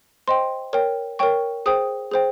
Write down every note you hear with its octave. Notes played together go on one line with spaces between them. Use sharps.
C5 D#5 G5 C6
A#4 C#5 G5
A#4 C#5 G5 C#6
G#4 C5 G5 D#6
G#4 C5 G5